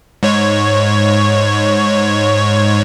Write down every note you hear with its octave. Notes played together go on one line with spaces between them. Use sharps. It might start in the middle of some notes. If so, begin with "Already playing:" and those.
G#2 C#5